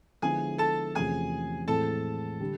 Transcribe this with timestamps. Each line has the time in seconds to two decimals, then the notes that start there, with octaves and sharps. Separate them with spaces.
0.22 D3 F3 G#3 B3 E4 G#4 G#5
0.58 A4 A5
0.95 E2 C3 F3 A3 C#4 G#4 G#5
1.68 A2 E3 G#3 C4 A4 A5
2.41 D3 G3